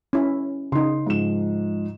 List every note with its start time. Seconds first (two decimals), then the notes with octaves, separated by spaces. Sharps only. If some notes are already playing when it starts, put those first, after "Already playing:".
0.13 C#4 E4
0.72 C#3 D#4 C6
1.06 G#2 F3 E7